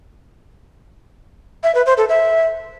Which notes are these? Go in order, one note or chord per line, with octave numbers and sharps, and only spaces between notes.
E5
B4
C5
A4
E5